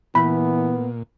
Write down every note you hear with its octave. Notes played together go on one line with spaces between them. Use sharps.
A#2 E3 B3 B5